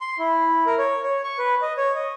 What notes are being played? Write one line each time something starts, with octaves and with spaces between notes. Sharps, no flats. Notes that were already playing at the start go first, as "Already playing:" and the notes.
C6
E4
A#4
C#5
C#5
C#6
B4
D#5
C#5
D#5